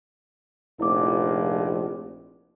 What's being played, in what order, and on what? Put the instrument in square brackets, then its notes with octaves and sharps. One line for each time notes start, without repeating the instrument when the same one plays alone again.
[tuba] F1 [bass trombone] A#1 [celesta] E4 D6